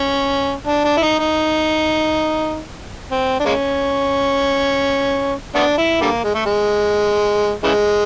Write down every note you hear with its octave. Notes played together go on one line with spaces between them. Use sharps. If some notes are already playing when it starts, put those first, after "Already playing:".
Already playing: C#4
D4
D4
E4
D#4
D#4
C4
D4
G#3 A#3 C#4
A3 B3 D4
E4
D3 G3 A#3
G#3
A3
G#3
C#3 E3 G#3